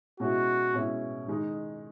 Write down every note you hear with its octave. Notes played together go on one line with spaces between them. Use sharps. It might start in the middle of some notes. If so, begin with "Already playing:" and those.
B2 G#3 C#4 E4 F#4
B2 G#3 C#4 E4
D#3 G#3 D#4